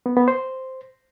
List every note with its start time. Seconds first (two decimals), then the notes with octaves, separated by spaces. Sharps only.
0.06 B3
0.17 B3
0.28 C5